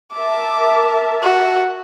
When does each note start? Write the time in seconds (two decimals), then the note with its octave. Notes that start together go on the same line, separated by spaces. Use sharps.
0.14 A#4 E5 A5 D6
1.23 F#4